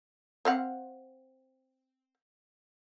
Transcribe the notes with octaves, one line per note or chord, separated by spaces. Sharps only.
C4 F5 F#5